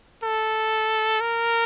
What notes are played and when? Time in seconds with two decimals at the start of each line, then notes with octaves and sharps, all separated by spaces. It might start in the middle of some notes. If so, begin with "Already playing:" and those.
0.24 A4
1.21 A#4